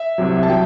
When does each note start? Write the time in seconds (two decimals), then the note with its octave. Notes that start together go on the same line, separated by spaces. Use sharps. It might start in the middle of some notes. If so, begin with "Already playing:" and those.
Already playing: E5
0.18 C2 C3 F#3
0.43 A5
0.49 F#3 G5